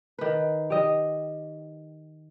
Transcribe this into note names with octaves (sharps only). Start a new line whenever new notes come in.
D#3 B4
G4 D#5